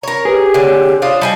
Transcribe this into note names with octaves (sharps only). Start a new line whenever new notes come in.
A#4 C#5 A#5
G4 G#4 B4
D3 C4 C#5
D4 F4 C5 D#6
G3 D#4 G#4 A5